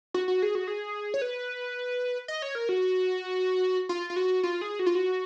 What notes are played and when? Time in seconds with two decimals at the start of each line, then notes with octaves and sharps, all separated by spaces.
0.14 F#4
0.28 F#4
0.42 G#4
0.55 F#4
0.68 G#4
1.14 C#5
1.22 B4
2.28 D#5
2.42 C#5
2.55 A#4
2.69 F#4
3.89 F4
4.10 F4
4.16 F#4
4.43 F4
4.61 G#4
4.79 F#4
4.86 F4
4.95 F#4